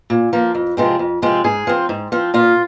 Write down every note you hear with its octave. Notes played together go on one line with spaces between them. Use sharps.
A#2
F3 A#3
F2
C3 F3 G#3 C4
F2
C3 F3 G#3 C4
G#2 G#4
F3 C4
G#2
F3 C4
A#2 F4